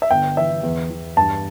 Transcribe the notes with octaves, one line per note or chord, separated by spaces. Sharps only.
E5
G1 G5
E3 E5
E2
E2
G2 A5